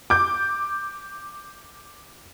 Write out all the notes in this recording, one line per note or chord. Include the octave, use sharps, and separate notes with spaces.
D6 G6